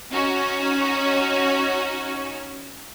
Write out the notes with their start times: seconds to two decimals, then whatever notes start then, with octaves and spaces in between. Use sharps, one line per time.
0.11 C#4 D#4 F#4